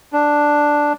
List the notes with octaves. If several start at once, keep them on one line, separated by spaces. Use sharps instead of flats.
D4